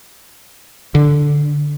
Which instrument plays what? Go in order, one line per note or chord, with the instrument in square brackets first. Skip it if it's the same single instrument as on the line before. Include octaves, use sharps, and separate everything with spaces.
[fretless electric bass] D3